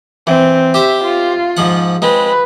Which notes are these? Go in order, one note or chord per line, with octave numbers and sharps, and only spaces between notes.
E3 C4
G4 C5 E5
F4
G#2 F3 F#5
G#3 C4 B4